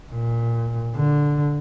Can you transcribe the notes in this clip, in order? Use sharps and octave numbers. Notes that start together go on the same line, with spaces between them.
A#2
D3